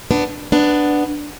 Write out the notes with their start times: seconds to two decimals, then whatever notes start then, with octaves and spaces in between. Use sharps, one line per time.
0.11 B3 D4
0.52 B3 D4